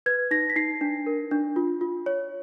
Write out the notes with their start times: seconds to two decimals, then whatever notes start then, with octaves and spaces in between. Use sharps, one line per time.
0.06 B4 G#6
0.31 D#4 A#6
0.50 B6
0.56 D#4 C7
0.81 D4
1.06 A#4
1.31 D4
1.56 F4
1.81 F4
2.06 C#5